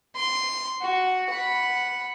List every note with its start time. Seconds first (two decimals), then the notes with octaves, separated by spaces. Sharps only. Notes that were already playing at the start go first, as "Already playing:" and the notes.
0.16 C6
0.82 F#4
1.31 F#5 B5